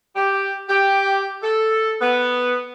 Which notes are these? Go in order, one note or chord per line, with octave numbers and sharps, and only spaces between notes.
G4
G4
A4
B3